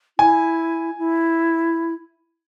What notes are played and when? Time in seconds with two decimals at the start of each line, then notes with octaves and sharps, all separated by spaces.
0.18 E4 G#5
0.98 E4